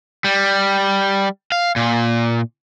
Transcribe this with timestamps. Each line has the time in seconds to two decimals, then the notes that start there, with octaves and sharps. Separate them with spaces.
0.24 G3
1.52 F5
1.76 A#2